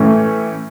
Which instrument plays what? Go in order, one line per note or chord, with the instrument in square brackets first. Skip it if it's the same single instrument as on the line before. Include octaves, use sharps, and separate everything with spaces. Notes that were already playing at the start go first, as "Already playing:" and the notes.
Already playing: [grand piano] A2 E3 A3 C#4